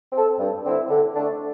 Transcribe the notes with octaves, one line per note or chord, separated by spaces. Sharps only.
C4 A4
G2
D3 C4 E4
D3
A3 D4